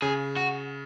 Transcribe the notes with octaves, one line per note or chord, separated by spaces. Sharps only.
C#3 G#4
F#4